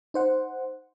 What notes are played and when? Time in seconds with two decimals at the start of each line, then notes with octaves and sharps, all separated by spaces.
0.14 D#4 C5 F#5